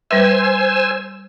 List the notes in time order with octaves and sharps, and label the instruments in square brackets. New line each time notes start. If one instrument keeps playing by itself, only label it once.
[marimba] G3 B4 E5 [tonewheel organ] C5 G#5 E6